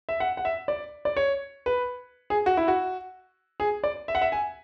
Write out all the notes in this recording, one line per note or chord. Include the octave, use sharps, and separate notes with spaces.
E5
F#5
F#5
E5
D5
D5
C#5
B4
G#4
F#4
E4
F#4
G#4
D5
E5
F#5
E5
G#5